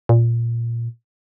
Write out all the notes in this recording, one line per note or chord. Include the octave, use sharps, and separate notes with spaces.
A#2